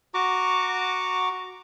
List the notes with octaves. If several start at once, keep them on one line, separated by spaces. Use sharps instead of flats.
F#4 A#5 C#6 D6